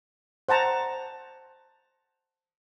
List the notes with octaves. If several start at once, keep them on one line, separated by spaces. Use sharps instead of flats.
C5 F#5 A5 A#5